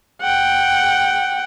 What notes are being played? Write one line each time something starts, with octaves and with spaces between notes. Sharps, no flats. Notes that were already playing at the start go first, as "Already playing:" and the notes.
F#5 G5